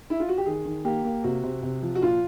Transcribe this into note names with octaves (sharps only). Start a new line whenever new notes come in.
E4
F4
F#4
G4
D#3 G#4
D#3
A#3 G4
A#3
C3 F#4
C3
C3
F3
F#4
A#2 F4